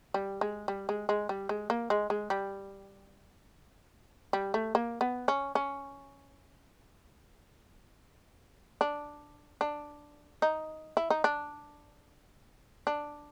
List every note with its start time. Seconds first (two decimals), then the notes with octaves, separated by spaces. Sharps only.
0.14 G3
0.41 G#3
0.68 G3
0.89 G#3
1.09 G#3
1.29 G3
1.49 G#3
1.70 A#3
1.90 G#3
2.10 G#3
2.30 G3
4.33 G3
4.54 A3
4.75 A#3
5.01 B3
5.28 C#4
5.55 C#4
8.81 D4
9.61 D4
10.42 D#4
10.97 E4
11.10 D#4
11.24 D4
12.87 D4